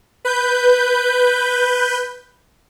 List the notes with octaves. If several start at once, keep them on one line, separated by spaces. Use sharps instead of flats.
B4 G6